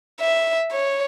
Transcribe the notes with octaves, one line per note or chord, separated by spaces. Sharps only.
E5
C#5